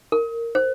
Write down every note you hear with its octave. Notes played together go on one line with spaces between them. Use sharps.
A#4
C5